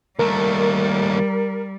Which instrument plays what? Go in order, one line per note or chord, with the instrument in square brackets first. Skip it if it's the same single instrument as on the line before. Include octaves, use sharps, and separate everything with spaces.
[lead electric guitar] D#2 A3 [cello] G3 [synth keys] A#4